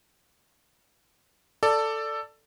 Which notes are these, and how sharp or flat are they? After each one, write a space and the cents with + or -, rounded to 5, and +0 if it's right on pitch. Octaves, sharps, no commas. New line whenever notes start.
A4 +10 D5 +0